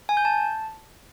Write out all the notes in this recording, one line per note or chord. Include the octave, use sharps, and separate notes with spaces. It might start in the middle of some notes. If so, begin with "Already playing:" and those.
G#5
G6
A5